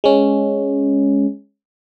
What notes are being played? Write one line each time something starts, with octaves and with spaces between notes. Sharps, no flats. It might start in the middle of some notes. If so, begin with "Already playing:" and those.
G#3 C#4